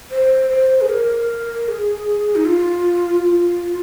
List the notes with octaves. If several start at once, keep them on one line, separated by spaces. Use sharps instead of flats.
C5
C5
G#4
A#4
G#4
D#4
F4
F4